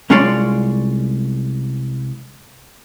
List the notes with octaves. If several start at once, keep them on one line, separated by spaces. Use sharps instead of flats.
C2 G#3 C#4 F4 D5 C6